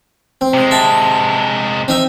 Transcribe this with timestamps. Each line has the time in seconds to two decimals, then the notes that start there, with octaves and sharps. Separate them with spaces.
0.41 C4
0.54 C3 G#3
0.71 E5 A5
1.88 C4 D#4 E5